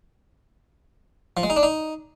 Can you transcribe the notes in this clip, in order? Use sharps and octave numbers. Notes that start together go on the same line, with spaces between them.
F3
G#3
D#4
D4
D#4